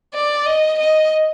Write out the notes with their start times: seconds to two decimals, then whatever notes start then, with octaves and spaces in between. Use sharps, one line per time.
0.14 D5
0.46 D#5
0.79 D#5